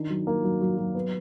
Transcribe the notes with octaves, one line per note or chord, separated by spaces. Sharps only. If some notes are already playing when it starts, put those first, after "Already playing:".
Already playing: D#3 D4
F#3
A#3
F#3
F#3
F#3
B3